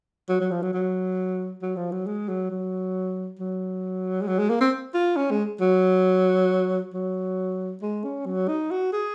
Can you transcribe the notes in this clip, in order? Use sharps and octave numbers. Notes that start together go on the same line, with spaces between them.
F#3
F#3
F3
F#3
F#3
F#3
F3
F#3
G#3
F#3
F#3
F#3
G#3
F#3
G#3
A#3
C4
F4
C#4
G#3
F#3
F#3
G#3
C#4
F#3
D#4
F#4
G#4